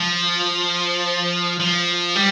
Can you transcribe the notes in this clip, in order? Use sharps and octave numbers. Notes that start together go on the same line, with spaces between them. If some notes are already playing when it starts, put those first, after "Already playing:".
Already playing: F3
F3
G3